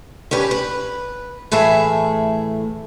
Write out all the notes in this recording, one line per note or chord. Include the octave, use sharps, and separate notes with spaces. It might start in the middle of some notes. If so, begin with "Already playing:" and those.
C#4 D4 G4 B4
B4
A2 E3 A3 G#4 E5